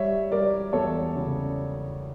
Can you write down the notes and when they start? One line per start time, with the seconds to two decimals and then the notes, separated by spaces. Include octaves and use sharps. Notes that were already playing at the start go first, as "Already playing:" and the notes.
Already playing: G3 C#5 E5
0.31 G3 A#4 D5
0.73 E2 A4 C#5
1.15 C#3